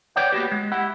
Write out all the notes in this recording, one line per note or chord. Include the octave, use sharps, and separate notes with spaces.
B4 C#5 D5 F#5 G5
A#3 B3 F#4 G4
G#3
E4 G4 F#5